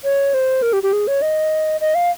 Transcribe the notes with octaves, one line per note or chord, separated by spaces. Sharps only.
C#5
C5
A#4
G4
G4
G#4
C#5
D#5
D#5
F5